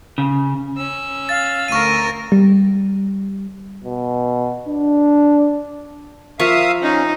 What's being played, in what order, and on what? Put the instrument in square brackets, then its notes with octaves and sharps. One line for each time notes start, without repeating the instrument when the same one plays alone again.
[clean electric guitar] C#3
[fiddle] C#4 E6
[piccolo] F5 [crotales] A6
[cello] D2 A#4 [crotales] C#6 D#7
[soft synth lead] G3
[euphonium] B2
D4
[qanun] F3 A#4 C#6 [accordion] E5 F5 D#6
[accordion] C#4 [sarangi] D#4